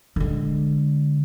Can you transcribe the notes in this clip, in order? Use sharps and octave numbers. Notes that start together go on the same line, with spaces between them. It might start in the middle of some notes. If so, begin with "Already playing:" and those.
D3 G#3